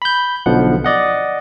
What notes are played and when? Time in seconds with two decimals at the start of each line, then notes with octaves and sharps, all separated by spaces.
0.02 B5 G6
0.46 B1 B2 D3 F3 F#5
0.85 D5 D#5 F#5